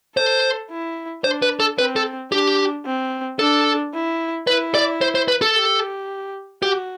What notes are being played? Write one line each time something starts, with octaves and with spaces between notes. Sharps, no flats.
A4 C5
E4
D4 C5
B4
A4
C4 B4
A4
D4 G4
C4
D4 A4
E4
E4 B4
D5
C5
C5
B4
A4
G4
F#4 G4